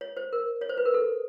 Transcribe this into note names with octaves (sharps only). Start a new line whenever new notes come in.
C#5
C5
A#4
C#5
C5
B4
A#4
A4